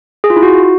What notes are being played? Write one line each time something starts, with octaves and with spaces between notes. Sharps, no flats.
G#4
F4
E4
F#4